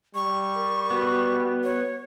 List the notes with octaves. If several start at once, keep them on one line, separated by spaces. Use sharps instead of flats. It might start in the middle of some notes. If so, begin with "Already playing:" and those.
G3 C#6
A#4
B3 F#4
C#5